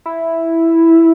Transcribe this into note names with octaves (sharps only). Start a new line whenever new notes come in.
E4